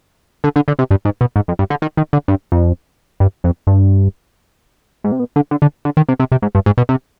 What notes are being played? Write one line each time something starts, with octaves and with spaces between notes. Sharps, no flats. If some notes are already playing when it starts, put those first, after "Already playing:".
D3
D3
D3
C3
G2
G#2
B2
G#2
F2
G2
D3
D#3
D#3
D3
G2
F2
G2
F2
G2
G#2
C3
B2
D3
D3
D3
D3
D#3
C3
C3
C3
G#2
G2
G#2
B2
C3